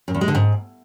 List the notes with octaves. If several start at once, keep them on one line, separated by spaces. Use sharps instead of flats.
F#2
E2
G#3
D3
G#2